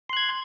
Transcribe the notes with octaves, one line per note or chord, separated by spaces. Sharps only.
C6 F#6 G#6